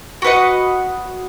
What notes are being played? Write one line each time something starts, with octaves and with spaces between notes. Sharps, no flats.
F#4 B4 D#5 F#5